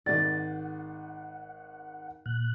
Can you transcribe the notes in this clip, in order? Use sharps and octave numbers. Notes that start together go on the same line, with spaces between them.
G#1 D5 F#5 A6
A#2 F#6